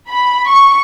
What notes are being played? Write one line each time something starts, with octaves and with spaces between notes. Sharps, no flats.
B5
C#6